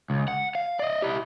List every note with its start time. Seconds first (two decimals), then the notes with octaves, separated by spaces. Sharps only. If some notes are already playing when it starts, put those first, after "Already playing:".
0.10 C#2
0.28 F#5
0.55 F5
0.79 D5 D#5
1.02 E4 G4